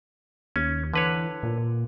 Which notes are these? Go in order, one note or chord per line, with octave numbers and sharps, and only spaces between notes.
D#2 C#4
D3 E3 B4 C#5
A#2